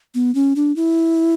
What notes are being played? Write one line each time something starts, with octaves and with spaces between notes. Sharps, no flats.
B3
C#4
D4
E4